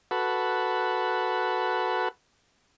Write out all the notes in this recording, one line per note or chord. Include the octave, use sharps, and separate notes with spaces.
F#4 A4 B4